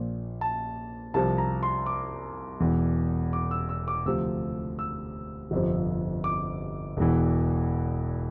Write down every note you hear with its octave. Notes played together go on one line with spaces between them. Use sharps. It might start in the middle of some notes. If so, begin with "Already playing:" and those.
Already playing: A#1 A#2 F3
A5
C2 C3 F3 A5
A#5
C6
D6
E1 E2 E3
D6
E6
E6
D6
D2 C3 F3 E6
E6
G1 F2 C3 F3
D6
E1 E2 E3